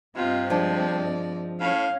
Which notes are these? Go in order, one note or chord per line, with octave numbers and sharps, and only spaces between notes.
G2 C3 C4 F4 D#5
F3 G#3 D4 D5
A2 C#4 F5